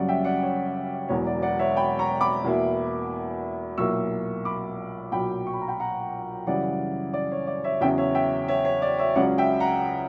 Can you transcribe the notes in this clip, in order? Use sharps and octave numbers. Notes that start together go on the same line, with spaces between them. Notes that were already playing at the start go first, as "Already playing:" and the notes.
Already playing: F#1 F#2 C#3 G3 C#4 D5 F#5
E5 G5
D5 F#5
C#5
E1 E2 B2 F#3 C#5
D5
D5 F#5
C#5 E5
G5 B5
A#5 C#6
B5 D6
E2 B2 A#3 E4
B1 A#2 A#3 E4 C#6 E6
B5 D6
B1 A#2 F#3 G5 B5
C#6
B5
A#5
G5 B5
F#5 A#5
F#2 C#3 E3 G3 D5 F#5
D5
C#5
D5
C#5 E5
E2 C#3 F#3 C#4 E5 G5
C#5 E5
E5 G5
C#5 E5
C#5
D5
C#5 E5
C#2 C#3 F#3 C#4 D5 F#5
E5 G5
F#5 A#5